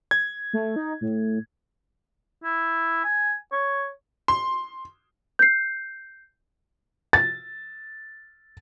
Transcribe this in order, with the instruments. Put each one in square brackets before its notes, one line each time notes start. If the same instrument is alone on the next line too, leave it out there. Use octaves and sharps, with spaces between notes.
[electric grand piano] G#6
[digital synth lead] A3
D#4
A2
[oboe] E4
G#5
C#5
[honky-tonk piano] C6
[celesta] G6 C7
[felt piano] A6